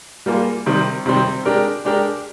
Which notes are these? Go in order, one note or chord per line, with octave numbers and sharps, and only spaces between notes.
G3 A#3 F4 G#4
C3 D#3 G3 C4
C3 D#3 G3 C4
G#3 D4 G4 A#4
G#3 D4 G4 A#4